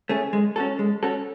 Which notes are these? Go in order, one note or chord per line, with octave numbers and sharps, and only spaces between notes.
A3 C#4 G#4
G#3
C#4 F#4 A4
G#3
C#4 F#4 A4